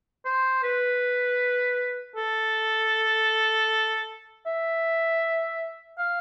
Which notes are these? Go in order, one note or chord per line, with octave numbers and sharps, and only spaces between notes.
C5
B4
A4
E5
F5